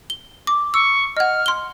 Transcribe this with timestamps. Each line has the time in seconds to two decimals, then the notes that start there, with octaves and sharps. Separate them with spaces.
0.10 G7
0.47 D6
0.74 C#6 E6
1.17 D#5 F#5 F6
1.46 C6 G7